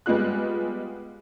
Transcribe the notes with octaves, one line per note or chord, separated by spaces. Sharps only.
G3 G#3 B3 F4 F#6